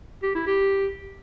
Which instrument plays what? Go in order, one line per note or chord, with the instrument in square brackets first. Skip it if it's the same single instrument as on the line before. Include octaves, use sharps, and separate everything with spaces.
[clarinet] G4
E4
G4